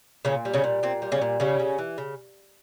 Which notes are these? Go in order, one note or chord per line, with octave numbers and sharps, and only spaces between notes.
A#2 C#3 C#4
G3
C#3 C#4
A#2
A#2 C4
G3
C#3 C#4
A#2
C#3 G3 C#4
C#3
E3
C#3